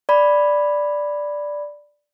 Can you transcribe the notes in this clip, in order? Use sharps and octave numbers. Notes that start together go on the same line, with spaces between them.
D5 B5